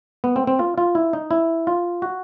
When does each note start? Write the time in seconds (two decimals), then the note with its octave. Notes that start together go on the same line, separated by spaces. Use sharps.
0.24 B3
0.36 C4
0.47 C4
0.59 F4
0.78 F4
0.95 E4
1.13 D#4
1.31 E4
1.67 F4
2.02 F#4